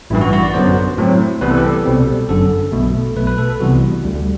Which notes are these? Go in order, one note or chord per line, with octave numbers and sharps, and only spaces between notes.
A1 G2 E3 E4
F#4
F#4
D5
F#2 D3 F#3 B3 C5
A2 F#3 C4
C2 C3 E3 G3 B3 B4
A4
G4
A4
C2 B2 G3 C4
G1 F#2 D3 A4
B1 B2 A3
B1 B2 A3 B4
B4
A4
A4
C2 C3 E3 G3 B3 F#4
D2 D3 G3